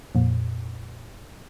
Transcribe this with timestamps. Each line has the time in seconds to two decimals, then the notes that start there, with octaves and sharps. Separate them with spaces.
0.15 F2 A#2